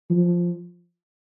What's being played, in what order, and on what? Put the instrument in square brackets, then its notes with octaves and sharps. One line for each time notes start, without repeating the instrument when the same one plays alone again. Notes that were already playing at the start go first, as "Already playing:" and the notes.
[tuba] F3